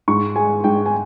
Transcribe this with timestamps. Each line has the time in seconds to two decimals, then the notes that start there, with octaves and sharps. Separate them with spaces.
0.08 G#2 C#6
0.36 G#3 G#5
0.64 G#2 G5
0.86 G#5